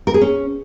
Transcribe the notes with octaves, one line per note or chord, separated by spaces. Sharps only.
A#4
G#4
C#4